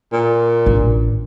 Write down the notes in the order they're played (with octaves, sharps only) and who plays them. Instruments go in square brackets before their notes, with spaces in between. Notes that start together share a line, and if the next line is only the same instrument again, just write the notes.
[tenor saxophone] A#2
[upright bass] A1 D3